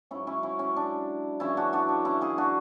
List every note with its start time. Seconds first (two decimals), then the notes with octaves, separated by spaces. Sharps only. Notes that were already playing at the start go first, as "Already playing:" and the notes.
0.11 G#2 F#3 C#4 E4
0.27 C#4 E4
0.43 C#4 E4
0.59 C#4
0.76 D4
1.40 F#2 C#3 E3 C#4 E4
1.57 D4 F#4
1.73 D4 F#4
1.88 D4
2.05 C#4 E4
2.21 E4 G#4
2.38 D4 F#4